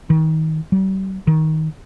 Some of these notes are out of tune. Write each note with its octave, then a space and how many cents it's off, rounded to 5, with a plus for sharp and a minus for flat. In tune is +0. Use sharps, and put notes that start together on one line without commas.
D#3 +30
G3 -40
D#3 +15